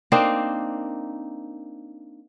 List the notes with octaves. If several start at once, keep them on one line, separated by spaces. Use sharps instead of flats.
A#3 C4 D4 D#4